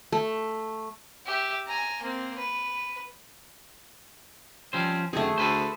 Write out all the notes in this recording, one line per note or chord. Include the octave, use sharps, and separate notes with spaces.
A3
G4 E5
G#5 A#5
A#3 C4
B4
F3 G3 C4 C#4 C5
F#2 D#3 A3 C4 G#4 A4
D2 A4 B4 C5